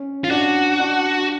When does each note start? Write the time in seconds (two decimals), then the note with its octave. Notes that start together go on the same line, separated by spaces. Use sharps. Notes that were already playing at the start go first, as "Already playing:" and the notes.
Already playing: C#4
0.24 F4
0.31 D4 F#4
0.79 D4